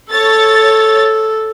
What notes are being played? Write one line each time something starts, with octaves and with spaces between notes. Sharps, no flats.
A4 C#5 A6